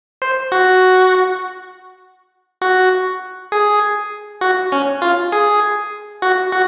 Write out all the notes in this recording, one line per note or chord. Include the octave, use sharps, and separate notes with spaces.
C5
F#4
F#4
G#4
F#4
C#4
F4
G#4
F#4
F#4